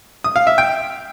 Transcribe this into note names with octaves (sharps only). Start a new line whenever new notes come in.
D#6
F5
E5
G5